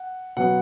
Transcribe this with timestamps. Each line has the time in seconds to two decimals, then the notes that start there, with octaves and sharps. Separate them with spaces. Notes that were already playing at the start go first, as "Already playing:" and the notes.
Already playing: F#5
0.37 B2 F#3 B3 F#5